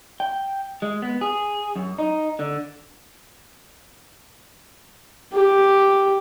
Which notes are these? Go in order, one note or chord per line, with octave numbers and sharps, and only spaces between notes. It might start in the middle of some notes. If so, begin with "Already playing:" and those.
G5
G#3
B3
G#4
F#2
D#4
D3
G4